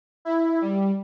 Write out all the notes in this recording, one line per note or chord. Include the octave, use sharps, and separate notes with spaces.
E4
G3